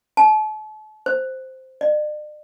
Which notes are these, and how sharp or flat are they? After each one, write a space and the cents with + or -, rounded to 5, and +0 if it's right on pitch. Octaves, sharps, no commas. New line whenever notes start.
A5 -40
C5 +0
D5 +45